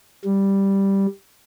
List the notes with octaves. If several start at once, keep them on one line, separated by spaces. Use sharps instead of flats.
G3